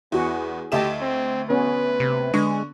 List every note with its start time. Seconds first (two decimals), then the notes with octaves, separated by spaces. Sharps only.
0.12 E2 B3 E4 F#4 G#4
0.72 D2 G4 A4 D#5 E5 A5 E7
1.01 C4
1.50 B3 C#4 B4
2.00 C3
2.34 D3 G#3 C#6